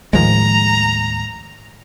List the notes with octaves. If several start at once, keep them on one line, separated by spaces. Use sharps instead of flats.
D#2 A2 D#3 F3 G#3 A#5